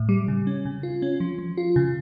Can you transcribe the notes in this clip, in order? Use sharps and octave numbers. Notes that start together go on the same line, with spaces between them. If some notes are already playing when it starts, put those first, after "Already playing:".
Already playing: A2
G3
C#3
C#4
C#3
F4
C#4
F3
F3
F4
C#3